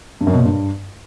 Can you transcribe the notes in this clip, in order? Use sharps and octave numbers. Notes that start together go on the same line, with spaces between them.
G2
F#2
B2
A#2
G2